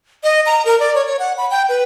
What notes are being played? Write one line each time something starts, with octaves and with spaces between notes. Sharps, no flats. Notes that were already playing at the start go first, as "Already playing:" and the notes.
D#5
A#5
A#4
D5
C#5
C#5
F#5
B5
G5
B4